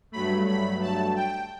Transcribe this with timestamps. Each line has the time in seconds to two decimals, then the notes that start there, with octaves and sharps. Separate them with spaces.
0.12 G2 F#3 A3 B5
0.47 B5
0.82 A5
1.16 G5